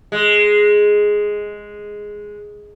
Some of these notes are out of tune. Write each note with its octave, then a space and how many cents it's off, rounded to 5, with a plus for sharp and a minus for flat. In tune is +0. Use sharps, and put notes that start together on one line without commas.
G#3 +0